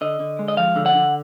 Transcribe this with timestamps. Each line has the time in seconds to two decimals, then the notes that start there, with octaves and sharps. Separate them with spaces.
0.01 D3 D#5
0.20 D3
0.39 G#3
0.48 D#5
0.57 F3 F5
0.76 D3
0.86 F#5
0.95 D3